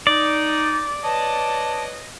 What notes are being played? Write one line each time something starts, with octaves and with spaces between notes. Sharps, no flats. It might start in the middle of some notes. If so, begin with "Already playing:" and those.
D#4 D5 D#6
B4 C#5 D#5 A5